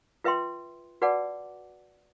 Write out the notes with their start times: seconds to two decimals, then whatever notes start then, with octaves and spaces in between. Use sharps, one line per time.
0.24 F4 B4 E5 G5 C6
1.02 F#4 B4 D5 F#5 A5 D6